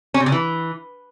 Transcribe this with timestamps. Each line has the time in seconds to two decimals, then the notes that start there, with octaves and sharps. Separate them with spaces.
0.14 C#4
0.20 C3
0.26 C#3
0.32 E3